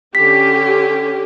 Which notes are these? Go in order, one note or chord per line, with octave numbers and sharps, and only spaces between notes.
D3 C#4 G4 B6